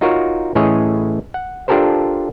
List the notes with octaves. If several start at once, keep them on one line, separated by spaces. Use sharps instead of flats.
D#4 F4 F#4 A#4 C#5
A2 E3 C#4 G#4 C#5 D#5
F#5
D4 F4 G4 A4 A#4 C5